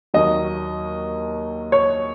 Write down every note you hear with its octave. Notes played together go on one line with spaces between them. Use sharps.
D#2 D#3 F#3 D#5
C#5